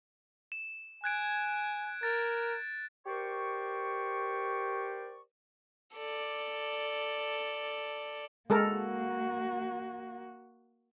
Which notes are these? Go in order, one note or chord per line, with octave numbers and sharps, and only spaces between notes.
E7
G#5 F#6 G#6 D7
A#4 A6
G4 A#4 C5 D5 C#6
A4 D5
G#3 A#3 F#4 A4 A#4